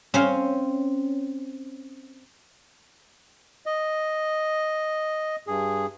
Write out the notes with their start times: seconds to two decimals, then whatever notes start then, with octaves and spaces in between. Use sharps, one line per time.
0.14 C4 C#4 C5 F5
3.66 D#5
5.47 G2 G#4